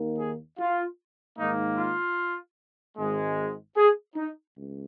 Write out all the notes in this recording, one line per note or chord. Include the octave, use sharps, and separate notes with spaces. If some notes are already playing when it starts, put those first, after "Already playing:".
Already playing: D#2 D#3 A#3
G#4
F4
G#2 D#3 A#3 D#4
F4
G#1 G#2 G#3
G#4
D#4
C#2